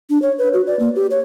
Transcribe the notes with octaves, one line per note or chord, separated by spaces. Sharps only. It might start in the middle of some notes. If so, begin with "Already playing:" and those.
D4
C#5
B4
F#4
D5
A#3
G4
C#5